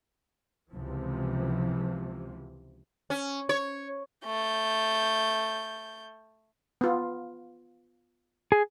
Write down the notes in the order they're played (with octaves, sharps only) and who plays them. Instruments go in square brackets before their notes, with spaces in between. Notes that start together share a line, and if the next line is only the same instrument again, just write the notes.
[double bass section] C#2 C3 E3 F3
[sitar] C#4
C#5
[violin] A3 G6
[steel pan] B3 F4
[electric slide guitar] G#4